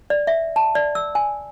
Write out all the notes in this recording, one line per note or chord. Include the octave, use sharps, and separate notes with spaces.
D5
E5
A5
D5
E6
G#5